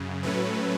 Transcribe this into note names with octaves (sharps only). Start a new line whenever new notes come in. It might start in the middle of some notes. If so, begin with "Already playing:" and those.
Already playing: F#2 C#3
A2 F#3 A3 C#4 B4